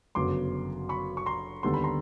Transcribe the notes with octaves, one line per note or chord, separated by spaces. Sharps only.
G1 F#2 C#3 F#3 B3 C6 D6
B5 C#6
C#6
A#5 C6
D#2 D3 G3 B3 C6
B5
A#5 C6